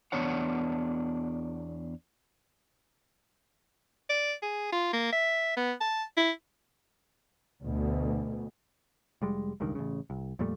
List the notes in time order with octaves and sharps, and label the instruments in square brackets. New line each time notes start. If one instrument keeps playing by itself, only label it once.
[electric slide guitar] E2 B3 D4 C#5 F#5
[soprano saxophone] D5
G#4
F4
A#3
E5
B3
A5
E4
[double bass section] D2 B2
[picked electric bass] F1 G3 G#3
E1 C#2 G2 D#3
A1 C#3
C2
F2 A#2 G3 A3